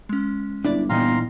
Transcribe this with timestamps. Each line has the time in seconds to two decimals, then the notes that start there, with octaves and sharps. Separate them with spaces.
0.09 G#3 C#4
0.65 G1 D4 E4 D5
0.90 A#2 E3 B3 D#4 F5 G5 A#5 C6